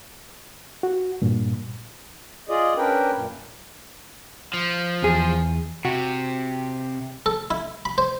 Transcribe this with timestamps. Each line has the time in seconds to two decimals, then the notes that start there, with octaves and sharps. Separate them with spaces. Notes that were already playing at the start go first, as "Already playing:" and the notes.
0.83 F#4
1.22 G2 A#2
2.49 F4 G#4 D5 D#5
2.77 C#4 D4 A#4 B4 G5
3.15 F#2 A#2
4.54 F3
5.02 E2 G#4
5.85 C3 F#4
7.26 A4
7.51 E4
7.85 B5
7.98 C5